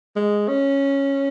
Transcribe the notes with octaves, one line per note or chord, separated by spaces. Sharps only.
G#3
C#4